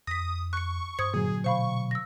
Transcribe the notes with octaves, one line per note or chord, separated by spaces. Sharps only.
F2 D#6 A#6 B6
C#6 F#6 C#7
G2 C5 D#6 G#6 C#7
A#2 D3 F#3 G#4
B2 C5 F5 B5 C#6
E6 A#6